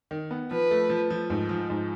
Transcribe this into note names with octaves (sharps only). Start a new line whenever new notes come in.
D#3
B3
F3 B4
A3
F3
F3
G#2
F3
G#2